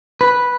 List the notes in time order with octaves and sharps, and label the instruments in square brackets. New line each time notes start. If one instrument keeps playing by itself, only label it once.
[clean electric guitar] B4